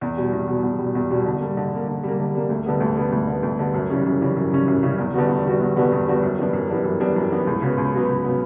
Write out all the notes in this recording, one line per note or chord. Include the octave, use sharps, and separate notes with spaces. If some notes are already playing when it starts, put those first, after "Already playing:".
E2
B2 G3
E2
B2 G3
E2
B2 G3
E2
B2 G3
D3
G3 A#3
D3
G3 A#3
D3
G3 A#3
D3
G3 A#3
D2
D3 G3 B3
D2
D3 G3 B3
D2
D3 G3 B3
D2
D3 G3 B3
F#2
C#3 E3 G3 C#4
F#2
C#3 E3 G3 C#4
F#2
C#3 E3 G3 C#4
F#2
C#3 E3 G3 C#4
E2
D3 G3 B3 F#4
E2
D3 G3 B3 F#4
E2
D3 G3 B3 F#4
E2
D3 G3 B3 F#4
F#2
E3 G3 B3 D4
F#2
E3 G3 B3 D4
F#2
E3 G3 B3 D4
F#2
E3 G3 B3 D4
C#2
C#3 F#3 B3
C#2
C#3 F#3 B3
C#2
C#3 F#3 B3